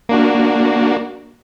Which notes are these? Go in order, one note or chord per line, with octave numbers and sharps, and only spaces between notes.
A#3 D4 F#4